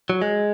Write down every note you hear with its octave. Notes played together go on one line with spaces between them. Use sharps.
F#3
G#3